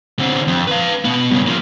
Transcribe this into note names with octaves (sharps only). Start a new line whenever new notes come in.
D3 C4
F2
B4 F5
B2 B3
G2 C#3
F3 A#3